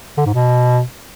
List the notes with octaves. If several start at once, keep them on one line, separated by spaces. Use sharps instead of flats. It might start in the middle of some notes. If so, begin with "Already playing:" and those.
D3
G#2
B2